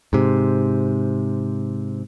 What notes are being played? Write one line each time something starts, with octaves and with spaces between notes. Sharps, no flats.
G#2 C3